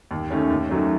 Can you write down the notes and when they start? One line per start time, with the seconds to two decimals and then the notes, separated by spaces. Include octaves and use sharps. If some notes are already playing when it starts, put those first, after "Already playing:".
0.11 D#2
0.30 D#3 A3 C#4
0.50 D#2
0.69 D#3 F#3 A3 C#4